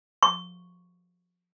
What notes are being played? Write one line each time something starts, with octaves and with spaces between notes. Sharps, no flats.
C#6